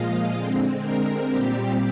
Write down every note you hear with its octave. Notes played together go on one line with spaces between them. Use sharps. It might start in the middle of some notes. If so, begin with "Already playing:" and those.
Already playing: A#2 F3 G#3 D#5 F5
D3 G#3 C4
A#4
A#2 G3 C4 G4